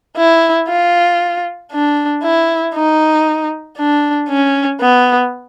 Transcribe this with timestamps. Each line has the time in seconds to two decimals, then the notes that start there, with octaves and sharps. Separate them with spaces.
0.17 E4
0.68 F4
1.72 D4
2.23 E4
2.74 D#4
3.78 D4
4.29 C#4
4.80 B3